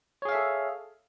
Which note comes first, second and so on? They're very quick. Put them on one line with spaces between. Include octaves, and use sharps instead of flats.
C#5 G#4 F5 E5 A4